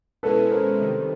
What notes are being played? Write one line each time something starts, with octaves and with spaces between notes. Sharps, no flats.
B2 G#3 C#4 E4 A4 B4
A#4 C5
C3 D#3 G3